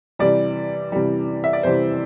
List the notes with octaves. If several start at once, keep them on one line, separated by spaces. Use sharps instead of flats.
C3 E3 G3 D5
C3 E3 G3
E5
D5
C3 E3 G3 C5